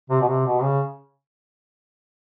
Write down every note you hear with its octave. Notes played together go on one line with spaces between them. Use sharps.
C3
B2
C3
B2
C#3